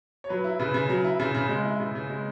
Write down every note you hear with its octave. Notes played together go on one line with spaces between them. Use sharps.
C#5
F#3 B4
E4
C#3 B4
C#3
F#3
E4
C#3
C#3
G#3
E4
C#3
C#3
G#3